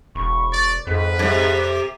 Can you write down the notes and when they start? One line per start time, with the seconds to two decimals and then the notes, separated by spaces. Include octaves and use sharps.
0.15 E1 B5 C#6
0.52 D5
0.87 F2 G#2 F3 B4
1.19 F#2 C3
1.58 D6